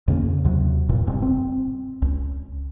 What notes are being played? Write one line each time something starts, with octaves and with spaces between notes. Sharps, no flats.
F2 C#3 A#3
D#2 C3 F#3
E1 G2 A#2
F#1 G2 C3
C4
C#2